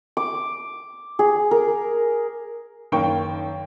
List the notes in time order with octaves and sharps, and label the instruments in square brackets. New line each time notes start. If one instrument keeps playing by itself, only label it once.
[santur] D6
G#4
A#4
[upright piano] F#1 D#3 A#3 G5 C#6